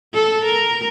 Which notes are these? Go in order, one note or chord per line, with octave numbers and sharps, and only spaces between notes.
A4
A#4